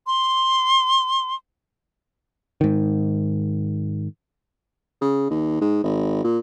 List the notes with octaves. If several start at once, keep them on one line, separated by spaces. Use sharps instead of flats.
C6
G#2 D#3
C#3
D#2
G#2
G#1
A#2